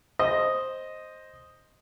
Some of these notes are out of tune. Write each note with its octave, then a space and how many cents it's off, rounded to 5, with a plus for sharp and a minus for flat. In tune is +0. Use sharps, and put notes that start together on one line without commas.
C5 +5 D#5 +0